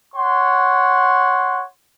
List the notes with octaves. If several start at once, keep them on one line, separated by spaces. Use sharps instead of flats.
C#5 F#5 C6